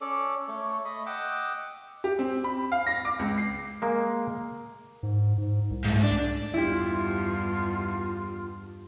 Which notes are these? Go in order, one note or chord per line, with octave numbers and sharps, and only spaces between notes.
C#4 A4 D5
A3 C#5
A3 D#5 B5
D#5 F#5 G5 D6 E6
G4
C4
B5
F5
A#6
D6
C#2
C7
G#3 A#3
G#2
G#2
C2
G#2 A3
D4
E2 G2 G3 E4 F4 G4